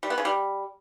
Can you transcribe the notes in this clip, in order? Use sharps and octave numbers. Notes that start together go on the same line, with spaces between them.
G3
B3
C#3
G3